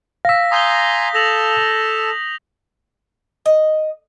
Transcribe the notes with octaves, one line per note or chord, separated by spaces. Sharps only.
F5 E6 A#6 B6
G#5 A#5 C6 D#6 G6 G7
A4 A5 A#6 F7 F#7
D#5